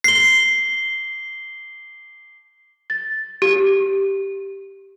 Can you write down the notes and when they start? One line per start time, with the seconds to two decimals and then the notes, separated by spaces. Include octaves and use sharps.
0.04 C7 G7
2.90 A6
3.42 G4